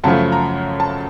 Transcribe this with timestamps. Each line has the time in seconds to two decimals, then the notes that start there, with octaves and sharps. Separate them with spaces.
0.04 F#2 C#3 F3 A3 A5
0.32 A#5
0.80 A5